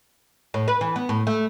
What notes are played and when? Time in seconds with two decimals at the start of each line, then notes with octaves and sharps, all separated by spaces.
0.54 A2
0.68 B4
0.81 E3
0.96 B3
1.09 A2
1.27 A3